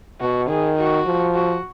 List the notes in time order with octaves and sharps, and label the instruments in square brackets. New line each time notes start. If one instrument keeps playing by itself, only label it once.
[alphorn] B2 [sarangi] F#4
[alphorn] D#3 [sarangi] G#4
[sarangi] F#4
[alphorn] F3
[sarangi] F#4